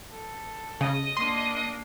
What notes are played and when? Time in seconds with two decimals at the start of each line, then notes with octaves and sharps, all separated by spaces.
0.10 A4
0.81 C#3 D#5
1.17 A#3 D4 C6